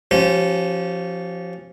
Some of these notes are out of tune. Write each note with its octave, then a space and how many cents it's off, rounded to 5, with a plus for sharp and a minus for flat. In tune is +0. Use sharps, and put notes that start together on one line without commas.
F3 +0 C#4 -15 G4 -35